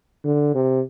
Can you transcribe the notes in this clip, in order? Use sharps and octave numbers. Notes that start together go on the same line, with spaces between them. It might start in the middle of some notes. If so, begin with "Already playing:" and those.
D3
C3